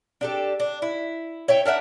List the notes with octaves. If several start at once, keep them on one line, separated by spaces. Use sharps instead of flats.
D4 G4 A4
D4
E4
C#5 E5 G5
D4 A#4 E5 F#5